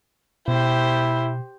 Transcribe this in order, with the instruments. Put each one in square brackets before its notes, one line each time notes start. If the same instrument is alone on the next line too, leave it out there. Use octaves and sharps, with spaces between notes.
[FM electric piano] B2 [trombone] E4 [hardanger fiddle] G4 C5